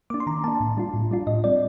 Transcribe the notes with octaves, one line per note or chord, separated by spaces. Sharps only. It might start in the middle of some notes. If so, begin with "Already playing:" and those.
A#3 D4 D6
C6
D#3 A#5
A#3 D4 A5
A2
G3 D4 F4
A2
G3 D4 F4
A2 D#5
G3 C4 D5